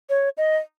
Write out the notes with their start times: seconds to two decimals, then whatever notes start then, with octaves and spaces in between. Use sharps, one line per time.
0.10 C#5
0.37 D#5